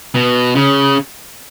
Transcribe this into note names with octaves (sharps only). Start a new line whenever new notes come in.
B2
C#3